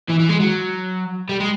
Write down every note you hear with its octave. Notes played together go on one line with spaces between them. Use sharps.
E3
E3
G#3
F#3
G3
G#3